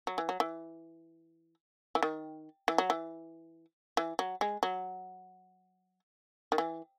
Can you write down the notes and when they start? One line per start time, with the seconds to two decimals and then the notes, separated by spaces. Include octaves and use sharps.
0.07 F#3
0.18 E3
0.29 F#3
0.40 E3
1.95 E3
2.03 D#3
2.68 E3
2.78 F#3
2.90 E3
3.97 E3
4.19 F#3
4.41 G#3
4.63 F#3
6.52 D#3
6.58 E3